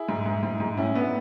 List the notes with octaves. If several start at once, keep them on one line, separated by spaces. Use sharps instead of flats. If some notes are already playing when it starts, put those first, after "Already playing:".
Already playing: E4 G#4
G#2
G#2
G#2
G#2
A2 C#4 E4
A2 B3 D4